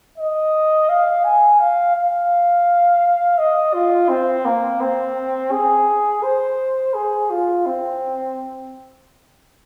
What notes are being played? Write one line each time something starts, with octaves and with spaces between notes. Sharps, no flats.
D#5
F5
G#5
F5
F5
D#5
F4
C4
A#3
C4
G#4
C5
G#4
F4
C4